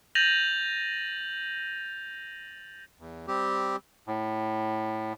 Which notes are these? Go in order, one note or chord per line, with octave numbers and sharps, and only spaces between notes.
G6 A6 A#6 D#7 F7 F#7
E2
G3 C4 G4
A2